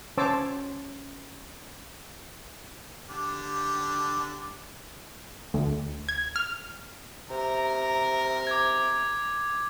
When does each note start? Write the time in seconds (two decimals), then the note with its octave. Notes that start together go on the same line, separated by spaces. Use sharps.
0.17 C#4 C5 C#5 A5 D6 E6
3.09 D3 D4 G4
5.54 D2
6.09 G#6
6.36 F6
7.30 C3 A#4
8.47 D6 G#6